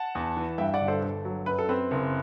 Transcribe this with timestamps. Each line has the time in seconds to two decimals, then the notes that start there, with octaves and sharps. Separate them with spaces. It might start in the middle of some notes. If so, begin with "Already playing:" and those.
Already playing: F#5 A5
0.15 E2
0.37 E3
0.58 G2 E5 G5
0.74 D5 F#5
0.81 G1
0.88 A4 C5
1.02 G1 A4
1.25 F#3
1.46 F#2 B4
1.59 A4
1.69 C4 B4
1.91 F#1